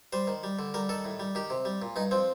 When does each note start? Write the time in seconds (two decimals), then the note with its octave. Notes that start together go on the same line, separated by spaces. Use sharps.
0.13 G3 C5
0.27 D#3
0.43 G3
0.59 D3
0.74 G3 A#4
0.89 D#3 A4
1.05 A2
1.20 G3
1.35 D#3 G4
1.50 C3
1.65 G3
1.82 A#2
1.96 G2 D#4
2.11 F3 C4